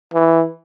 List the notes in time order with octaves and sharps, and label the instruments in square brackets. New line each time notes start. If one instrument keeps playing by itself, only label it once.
[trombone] E3